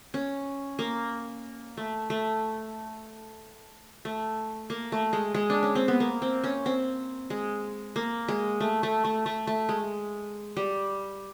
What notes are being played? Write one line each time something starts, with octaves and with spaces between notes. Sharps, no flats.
C#4
A#3
A3
A3
A3
A#3
A3
G#3
G#3
D4
C#4
C4
B3
A#3
C4
C#4
C4
G#3
A#3
G#3
A3
A3
A3
A3
A3
G#3
G3